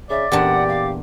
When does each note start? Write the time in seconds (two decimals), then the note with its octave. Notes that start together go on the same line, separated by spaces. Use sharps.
0.10 C#3 D5 E5
0.32 E2 A#2 D4 G4 F#5
0.69 F5